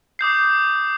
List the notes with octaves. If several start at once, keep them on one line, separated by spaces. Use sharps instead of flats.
D6 D#6 G6 C7